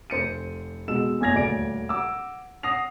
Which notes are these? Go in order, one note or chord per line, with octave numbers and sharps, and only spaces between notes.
F1 C5 C#7 D#7
B2 G#3 E6 E7
F#1 E2 G#5 G#6 A#6 F7
D#1 D2 D5 D7
F#5 D6 E6
F#5 D#6 A#6 C7 F7